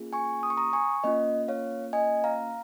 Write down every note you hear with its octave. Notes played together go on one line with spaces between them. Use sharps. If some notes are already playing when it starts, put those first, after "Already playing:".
Already playing: A#3 C#4 F4 G#4
G#5 C#6
D#6
C#6
A#5 D#6
G#5 C#6
A#3 C#4 F4 D#5
C#5 F5
D#5 G#5
F5 A#5